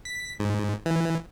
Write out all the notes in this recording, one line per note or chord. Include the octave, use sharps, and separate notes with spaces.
B6
G#2
E3